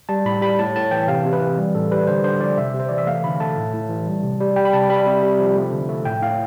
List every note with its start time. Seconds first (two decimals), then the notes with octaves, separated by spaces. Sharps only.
0.09 G3 A5
0.25 A2 B5
0.42 G3 B5
0.59 A2 A5
0.76 A2 A5
0.91 E3 G5
1.08 C3 F5
1.24 C3
1.33 B4
1.41 E3
1.57 G3
1.75 A2 A4
1.91 G3 B4
2.07 D3 C5
2.24 D3 C5
2.41 F3 D5
2.58 C3 E5
2.74 C3
2.80 C5
2.89 E3 D5
2.98 E5
3.07 A3 F5
3.24 D3 B5
3.40 A3 A5
3.57 A2
3.74 A2
3.89 E3
4.07 G3
4.23 C3
4.40 G3
4.56 G3 G5
4.65 B5
4.73 C3 A5
4.89 G3 B5
5.07 C3
5.23 C3
5.40 F3
5.55 A3
5.72 D3
5.89 A3
6.05 A2 G5
6.22 A2 F5